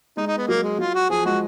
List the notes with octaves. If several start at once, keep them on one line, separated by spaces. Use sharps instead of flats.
G#3 D#4
D#4
B3
F#3 A#3
G#3
F#3 F4
F#4
F3 G#4
G#3 F#4